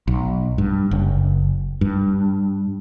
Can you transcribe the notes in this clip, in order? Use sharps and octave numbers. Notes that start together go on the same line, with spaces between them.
B1
G2
F#1
G2